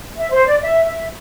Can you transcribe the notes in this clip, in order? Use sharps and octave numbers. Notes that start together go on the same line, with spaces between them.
E5
C5
D5
E5
E5